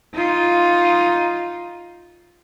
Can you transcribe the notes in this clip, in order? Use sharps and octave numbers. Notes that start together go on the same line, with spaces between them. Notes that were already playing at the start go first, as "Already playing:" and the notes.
D#4 F4